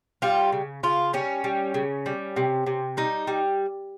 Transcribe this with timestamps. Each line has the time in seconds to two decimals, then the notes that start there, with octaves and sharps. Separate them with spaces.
0.22 G3 F4
0.52 C#3
0.83 C#3 F4
1.13 G3 C#4
1.44 G3
1.74 C#3
2.06 G3
2.36 C3
2.66 C3
2.97 G3 D#4
3.27 G3